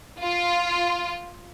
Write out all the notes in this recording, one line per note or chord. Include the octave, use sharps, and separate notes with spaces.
F4